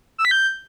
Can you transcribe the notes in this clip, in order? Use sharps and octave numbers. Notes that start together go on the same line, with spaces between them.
E6
B6
G6